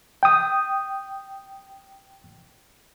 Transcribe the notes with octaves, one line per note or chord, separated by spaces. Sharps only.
G5 D#6